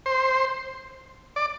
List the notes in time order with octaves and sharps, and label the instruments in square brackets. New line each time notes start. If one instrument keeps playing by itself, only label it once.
[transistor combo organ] C5
D5